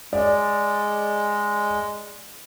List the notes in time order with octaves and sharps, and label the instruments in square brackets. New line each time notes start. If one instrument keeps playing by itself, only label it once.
[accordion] G#3 [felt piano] D5